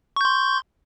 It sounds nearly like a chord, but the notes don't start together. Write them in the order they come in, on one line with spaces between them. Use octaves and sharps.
C#6 G6 C6